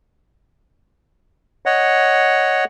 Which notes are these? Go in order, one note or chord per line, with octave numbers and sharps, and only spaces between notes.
C#5 D#5 F#5